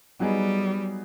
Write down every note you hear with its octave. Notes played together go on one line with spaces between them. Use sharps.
F#3 G3 B3 D#4 G#4